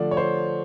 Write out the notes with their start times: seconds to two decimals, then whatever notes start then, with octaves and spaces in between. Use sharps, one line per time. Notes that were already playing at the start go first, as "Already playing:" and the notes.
Already playing: D3 F3 A3 D5
0.11 C#5
0.17 C5